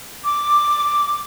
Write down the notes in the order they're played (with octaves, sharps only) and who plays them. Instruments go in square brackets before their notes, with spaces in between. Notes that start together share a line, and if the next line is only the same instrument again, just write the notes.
[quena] D6